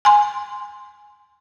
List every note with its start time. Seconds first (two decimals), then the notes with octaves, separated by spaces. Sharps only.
0.05 G#5 C6